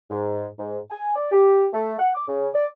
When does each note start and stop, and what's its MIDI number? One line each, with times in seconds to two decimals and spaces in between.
0.10 0.45 44
0.58 0.78 44
0.90 1.12 80
1.15 1.31 74
1.32 1.66 67
1.73 1.94 57
1.99 2.13 78
2.15 2.25 86
2.28 2.48 49
2.54 2.66 74